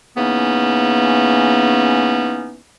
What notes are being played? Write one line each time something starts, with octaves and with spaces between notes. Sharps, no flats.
C#3 E3 A#3 B3 C#4 D#4